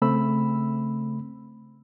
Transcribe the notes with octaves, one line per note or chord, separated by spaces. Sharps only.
C#3 A3 C4 B5 E6